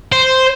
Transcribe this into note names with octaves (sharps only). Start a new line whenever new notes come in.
C5